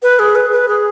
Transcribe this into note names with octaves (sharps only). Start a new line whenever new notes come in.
B4
G#4
B4
B4
G#4